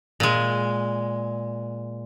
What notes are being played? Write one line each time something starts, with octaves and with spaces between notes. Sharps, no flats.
A#2 G#3